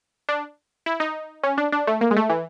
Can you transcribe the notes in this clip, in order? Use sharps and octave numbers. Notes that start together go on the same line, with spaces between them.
D4
E4
D#4
C#4
D4
D4
A3
A#3
G#3
A3
E3